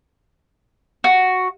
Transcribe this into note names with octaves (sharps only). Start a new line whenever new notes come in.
F#4